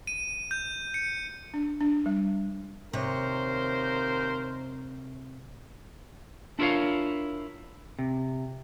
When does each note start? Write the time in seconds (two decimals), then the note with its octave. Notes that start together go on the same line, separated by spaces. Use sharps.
0.07 D#7
0.51 G6
0.94 C#7
1.54 D4
1.81 D4
2.06 G3
2.93 D#2 C3 A#4 C5 C#5
6.59 D4 E4 F4 A#4 C#5 F5
7.99 C3